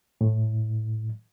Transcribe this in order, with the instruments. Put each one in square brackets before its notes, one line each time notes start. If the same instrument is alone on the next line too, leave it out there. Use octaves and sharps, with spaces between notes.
[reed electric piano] A2